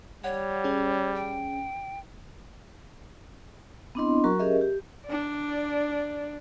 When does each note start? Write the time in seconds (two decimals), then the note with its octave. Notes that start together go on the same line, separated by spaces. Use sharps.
0.24 G3 C#5 F#5
0.64 C#4 G#4
1.15 G5
3.95 B3 C4 D4 E4 D#5 C6
4.24 F#3 F#4 A#4 A#5 C#6
4.39 C#4 G4 G#4 A#4 D#5 E5
4.61 G4
5.06 D4 D5